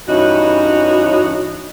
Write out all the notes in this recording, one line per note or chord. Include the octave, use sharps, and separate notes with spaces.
G2 E3 C#4 D#4 F#4